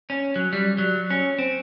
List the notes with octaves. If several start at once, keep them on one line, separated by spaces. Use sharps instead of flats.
C#4
F#3
G3
F#3
C#4
C4